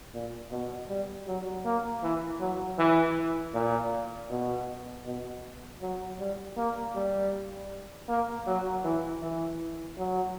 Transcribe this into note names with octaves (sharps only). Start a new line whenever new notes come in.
A#2
B2
G3
F#3
A#3
E3
F#3
E3
A#2
B2
B2
F#3
G3
A#3
G3
A#3
F#3
E3
E3
F#3